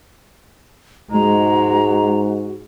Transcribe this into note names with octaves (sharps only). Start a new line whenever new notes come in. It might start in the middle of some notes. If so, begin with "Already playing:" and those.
G#2 G#3 F#4 A#5